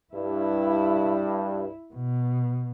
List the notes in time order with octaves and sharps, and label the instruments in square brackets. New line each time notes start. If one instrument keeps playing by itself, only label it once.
[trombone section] G2 [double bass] E4
[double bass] B2